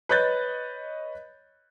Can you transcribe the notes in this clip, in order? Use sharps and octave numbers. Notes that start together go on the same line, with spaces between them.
B4 C#5 D#5 F#6 G6 A6